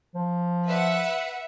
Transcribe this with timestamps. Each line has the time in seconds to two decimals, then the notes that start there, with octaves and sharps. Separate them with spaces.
0.15 F3
0.65 B4 E5 F#5